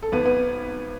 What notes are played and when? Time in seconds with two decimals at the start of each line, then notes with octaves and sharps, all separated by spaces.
0.03 A4
0.12 G#1 B3 B4
0.25 B3 B4